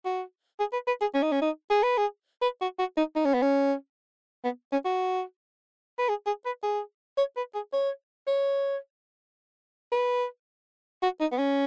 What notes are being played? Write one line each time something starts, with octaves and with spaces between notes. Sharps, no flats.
F#4
G#4
B4
B4
G#4
C#4
D#4
C#4
D#4
G#4
B4
G#4
B4
F#4
F#4
D#4
D#4
C#4
B3
C#4
B3
C#4
F#4
B4
G#4
G#4
B4
G#4
C#5
B4
G#4
C#5
C#5
B4
F#4
D#4
B3
C#4